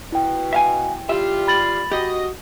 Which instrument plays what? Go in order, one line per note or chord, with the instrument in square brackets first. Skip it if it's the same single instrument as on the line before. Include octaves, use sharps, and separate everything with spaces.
[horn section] B2 [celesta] E4 G5
[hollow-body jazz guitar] E5 F5 G#5
[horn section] G3 F4 [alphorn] G4 [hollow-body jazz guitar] E5
[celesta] B5 A6 F#7
[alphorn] F#4 [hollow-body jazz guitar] G4 [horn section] D#5